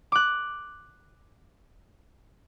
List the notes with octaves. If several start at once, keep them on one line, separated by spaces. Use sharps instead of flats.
D6 F#6